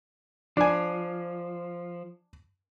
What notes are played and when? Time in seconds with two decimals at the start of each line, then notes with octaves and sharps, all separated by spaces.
0.57 F3 D4 G#5